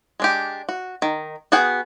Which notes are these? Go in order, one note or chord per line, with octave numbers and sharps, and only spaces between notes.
G#3 D4 G4
F#4
D#3
B3 F#4 G#4 F#5 G5